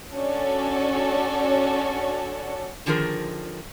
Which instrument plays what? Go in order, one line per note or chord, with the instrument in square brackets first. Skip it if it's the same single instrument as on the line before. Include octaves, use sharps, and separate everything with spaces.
[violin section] C#4 D4 F#4 A4 C#5 D5
[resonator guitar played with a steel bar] D3 D#3 F3 G#4 A#4